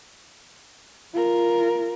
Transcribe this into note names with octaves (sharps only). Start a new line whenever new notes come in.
F4 A#4